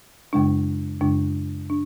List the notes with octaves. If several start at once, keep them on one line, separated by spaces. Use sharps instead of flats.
F#2 C#3 G#3 D4
F#2 C#3 G#3 D4
D4